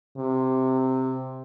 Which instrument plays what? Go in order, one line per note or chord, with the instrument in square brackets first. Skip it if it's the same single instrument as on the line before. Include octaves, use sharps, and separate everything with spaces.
[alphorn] C3